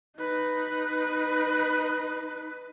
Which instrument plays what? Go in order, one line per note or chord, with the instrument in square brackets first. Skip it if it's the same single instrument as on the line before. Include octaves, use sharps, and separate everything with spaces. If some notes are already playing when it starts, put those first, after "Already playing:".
[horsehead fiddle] D#4 B4